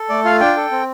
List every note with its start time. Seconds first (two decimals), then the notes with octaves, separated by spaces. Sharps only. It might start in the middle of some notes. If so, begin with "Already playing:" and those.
Already playing: A4
0.09 A3 D5
0.25 F4 F5
0.41 D4 G5
0.57 A4
0.72 C4